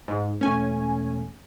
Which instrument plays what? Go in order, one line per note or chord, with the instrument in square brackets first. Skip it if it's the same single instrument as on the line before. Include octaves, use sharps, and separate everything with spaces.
[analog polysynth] G#2
[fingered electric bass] E1 A3 [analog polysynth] C#4 G#5